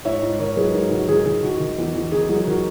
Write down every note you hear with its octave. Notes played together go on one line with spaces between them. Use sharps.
G#2 C#5 E5
G#2
D#3 A#4 C#5
F#3 G#4 B4
G#2 F#4 A#4
D#3 F#4
D#3 G#4
D#3 G#4
D#3 F#4
D#3
E2
E2
D#3 G#4
F#3 G#4
D#3 F#4 A#4